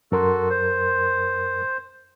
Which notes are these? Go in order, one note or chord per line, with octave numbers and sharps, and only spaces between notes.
F#2 F#4 A4 A#4 C6
C5